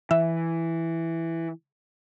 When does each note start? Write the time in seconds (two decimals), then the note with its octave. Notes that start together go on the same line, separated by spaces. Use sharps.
0.11 E3 E5